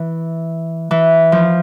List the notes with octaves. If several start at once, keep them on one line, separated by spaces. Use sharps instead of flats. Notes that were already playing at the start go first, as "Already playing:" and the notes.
Already playing: E3
E3
F3